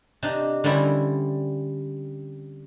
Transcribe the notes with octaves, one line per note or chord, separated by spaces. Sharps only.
C3 D4 D#4
D3 G3 C4 C#4 E4